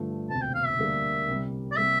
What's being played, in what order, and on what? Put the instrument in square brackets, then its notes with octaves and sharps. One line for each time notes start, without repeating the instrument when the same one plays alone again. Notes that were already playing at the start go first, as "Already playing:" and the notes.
Already playing: [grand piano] G2 D3 F3 A3
[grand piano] E1 D2 C3 [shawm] A5
[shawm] G5
F5
E5
[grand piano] D2 D3 G3 A#3 D4
C2 C3 G3
[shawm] D5
[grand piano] C3 G3 A#3 [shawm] E5